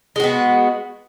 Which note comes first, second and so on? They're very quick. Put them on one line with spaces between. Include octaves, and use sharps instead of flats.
G#3 F#4 B3